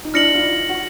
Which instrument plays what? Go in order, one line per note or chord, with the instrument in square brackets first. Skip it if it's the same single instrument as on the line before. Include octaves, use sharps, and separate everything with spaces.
[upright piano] D#4
[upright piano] D4 E4 [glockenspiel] F6 A#6 C#7 F#7
[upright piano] D#4 F4
F#4